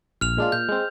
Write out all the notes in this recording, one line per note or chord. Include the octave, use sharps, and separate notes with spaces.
A#1 F6 F7
A#2 G#3 D4 F4
A#2 G6
G#3 C4